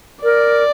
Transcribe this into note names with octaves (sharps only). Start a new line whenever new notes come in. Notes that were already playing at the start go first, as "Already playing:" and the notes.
A#4 D5